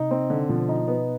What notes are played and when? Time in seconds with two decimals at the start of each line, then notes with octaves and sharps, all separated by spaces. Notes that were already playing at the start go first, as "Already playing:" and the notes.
Already playing: C3 D#4
0.11 C4
0.30 D3
0.49 B2 F3
0.69 D#4
0.88 B3